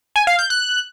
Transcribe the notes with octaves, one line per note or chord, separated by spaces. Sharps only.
G#5
F5
G6
F#6